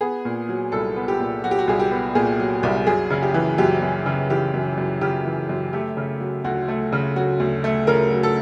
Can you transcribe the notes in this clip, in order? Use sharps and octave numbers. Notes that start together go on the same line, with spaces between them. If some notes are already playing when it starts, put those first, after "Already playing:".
B3 G#4
A#2
F#3
C2 A4
B3
G4
A#2
F#3 F#4
G4
F#4
C2 G#4
G4
B3
A#2 G#4
F#3
C2
F#2 G#4
C#3
G4
E3
F#2 G4
F#2
C#3
E3 G4
F#2
F#2
C#3 G4
E3
F#2
A3 G4
C#3
F#3
D2 F#4
A3
C#3
F#3 F#4
D2
A3
C#3 A#4
F#3
A4